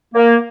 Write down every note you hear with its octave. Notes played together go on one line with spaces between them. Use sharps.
A#3